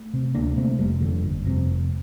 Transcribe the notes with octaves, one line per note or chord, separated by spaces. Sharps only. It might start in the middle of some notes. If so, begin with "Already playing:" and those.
Already playing: A3
C3
D2 A#3 D4
C3 A3 C4
F1 G3 A#3
F2 D3
G1
F2 C3
F1